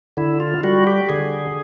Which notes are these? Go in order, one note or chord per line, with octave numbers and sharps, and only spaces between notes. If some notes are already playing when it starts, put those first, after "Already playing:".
D3 E4
F4
G3 F#4
G4
D3 G#4